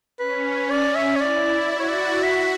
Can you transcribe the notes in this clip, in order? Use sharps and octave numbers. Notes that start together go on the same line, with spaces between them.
C#4 B4
C#4 D5
E5
C#5
E4 D5
F#4 D5
C#5
D5
F#4 E5